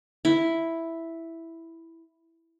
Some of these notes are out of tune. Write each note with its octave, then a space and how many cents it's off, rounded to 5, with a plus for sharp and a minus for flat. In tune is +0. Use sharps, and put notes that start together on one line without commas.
E4 +0